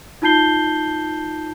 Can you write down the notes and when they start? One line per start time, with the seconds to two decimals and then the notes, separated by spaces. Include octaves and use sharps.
0.22 D#4 F4 A5 G6 C7 G7